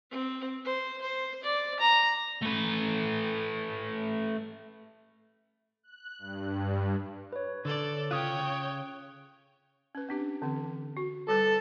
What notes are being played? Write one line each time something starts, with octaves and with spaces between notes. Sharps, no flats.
C4
C5
C5
D5
A#5
A3 B4
F#6
G2
B4 C#5
D3 A4 D5
C#3 F4 C#5 G5 D#6 F#6
C#3
C#4 B4
C4 D4 G4
D3 E3 C4
F#4
G3 A4 B4 D6